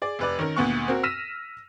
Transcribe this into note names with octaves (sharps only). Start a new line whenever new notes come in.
G#4 D5
F1 B4 D5
D#3 C#4 A#4
D2 A#2 B3 F#5 C#6
C4 F#4 A#4
E6 F6 A#6 B6 D#7 E7